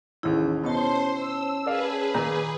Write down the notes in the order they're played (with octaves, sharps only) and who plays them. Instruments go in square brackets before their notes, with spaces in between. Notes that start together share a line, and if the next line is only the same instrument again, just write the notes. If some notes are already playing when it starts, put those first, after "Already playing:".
[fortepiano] A1 D#2 [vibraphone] C#4 G#4 [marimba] E4
[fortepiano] B2 D#4 [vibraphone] C#4 C#5 A5 [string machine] C5 C6
[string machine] E6
[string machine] G#4 B4 [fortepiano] A#4 D5 F5
[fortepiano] A#2 A#5 [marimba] D#3 [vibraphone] D#6